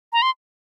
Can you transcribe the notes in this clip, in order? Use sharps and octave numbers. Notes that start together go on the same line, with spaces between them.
A#5
C6